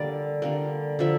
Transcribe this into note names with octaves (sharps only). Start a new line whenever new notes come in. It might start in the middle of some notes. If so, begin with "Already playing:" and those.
Already playing: D3 G3 A#3 D5
D3 G3 A#3
D3 F3 A#3 E5